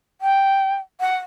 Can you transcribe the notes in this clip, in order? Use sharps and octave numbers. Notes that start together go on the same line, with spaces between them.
G5
F#5